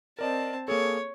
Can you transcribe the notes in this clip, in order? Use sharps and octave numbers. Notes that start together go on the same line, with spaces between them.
C4 A#4 D5 D#5 A5
A#3 G#4 A4 C#5